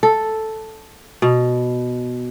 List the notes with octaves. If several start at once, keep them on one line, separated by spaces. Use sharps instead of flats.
A4
B2